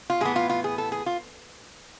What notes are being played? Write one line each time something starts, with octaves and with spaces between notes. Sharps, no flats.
F4
A2 E3 B3 G#4
F4
F4
G#4
A4
G#4
F4